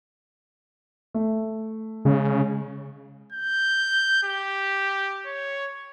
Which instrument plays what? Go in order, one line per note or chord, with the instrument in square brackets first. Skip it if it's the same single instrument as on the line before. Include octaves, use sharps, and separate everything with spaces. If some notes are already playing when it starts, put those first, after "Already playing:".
[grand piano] A3
[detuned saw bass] C#3 [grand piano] G#3
[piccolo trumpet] G6
G4
C#5